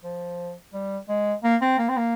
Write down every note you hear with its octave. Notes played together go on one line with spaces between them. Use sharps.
F3
G3
G#3
A#3
C4
A#3
C4
A#3